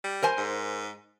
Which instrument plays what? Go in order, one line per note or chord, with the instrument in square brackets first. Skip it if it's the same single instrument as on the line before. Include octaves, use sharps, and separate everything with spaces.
[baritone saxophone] G3
[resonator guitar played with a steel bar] A#4 C5 G#5
[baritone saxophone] G#2